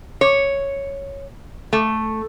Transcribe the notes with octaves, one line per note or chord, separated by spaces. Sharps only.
C#5
A3